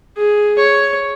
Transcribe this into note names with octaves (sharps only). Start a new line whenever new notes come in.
G#4
C#5